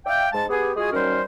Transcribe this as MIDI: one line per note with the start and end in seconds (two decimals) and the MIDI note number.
0.06 0.27 74
0.06 0.27 76
0.06 0.27 77
0.06 0.27 79
0.33 0.44 44
0.33 0.44 56
0.33 0.44 81
0.49 0.71 59
0.49 0.71 67
0.49 0.71 68
0.76 0.88 56
0.76 0.88 65
0.76 0.88 66
0.76 0.88 68
0.93 1.20 51
0.93 1.20 54
0.93 1.20 55
0.93 1.20 61
0.93 1.20 70
0.93 1.20 72